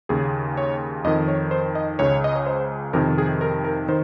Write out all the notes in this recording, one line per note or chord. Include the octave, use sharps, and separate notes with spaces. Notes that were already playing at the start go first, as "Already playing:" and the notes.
D#2 C#3 G#4
C#5
F2 D#3 D#5
C#5
C5
D#5
C#2 C#3 C#5
D#5
C#5
C5
F2 C3 D#3 A#4
G#4
A#4
A#4
D#3 C5